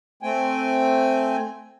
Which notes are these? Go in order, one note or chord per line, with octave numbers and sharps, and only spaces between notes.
A3 C4 G5 G#5